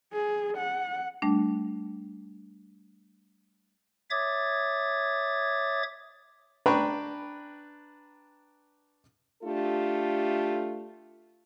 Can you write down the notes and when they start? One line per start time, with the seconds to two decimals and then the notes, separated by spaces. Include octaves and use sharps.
0.13 G#4
0.58 F#5
1.22 G3 A3 D4
4.11 C#5 E5 D6 D#6 G#6 A6
6.66 D4 B4 G5 A#5 B5 C#6
9.44 A3 D4 F4 G4 A4